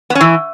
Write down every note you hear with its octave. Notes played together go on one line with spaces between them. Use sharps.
B3
C#4
E3